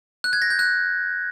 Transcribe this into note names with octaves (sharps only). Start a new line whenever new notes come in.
F#6
G#6
A#6
G6
F#6